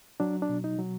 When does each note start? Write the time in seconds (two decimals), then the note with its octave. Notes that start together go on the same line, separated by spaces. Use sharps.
0.20 F#3 D4
0.42 D4
0.49 B2
0.64 D#4
0.79 F#3